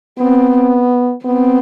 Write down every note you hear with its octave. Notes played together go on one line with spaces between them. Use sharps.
B3 C4
B3 C4